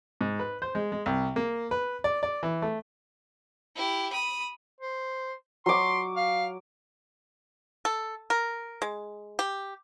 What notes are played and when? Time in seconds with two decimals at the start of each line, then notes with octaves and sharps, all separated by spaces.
0.21 G#2
0.40 B4
0.62 C5
0.75 G#3
0.92 G#3
1.06 C2
1.36 A#3
1.71 B4
2.04 D5
2.23 D5
2.43 E3
2.62 A3
3.76 E4 G4
4.13 B5 D#6
4.81 C5
5.66 F#3 C6 D6
6.17 F5
7.85 A4
8.30 A#4
8.82 G#3
9.39 G4